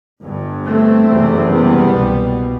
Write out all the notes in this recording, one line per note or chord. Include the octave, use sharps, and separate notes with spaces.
G1 G2
A3 C4
F#1 E2 C3
G3 B3
C2 B2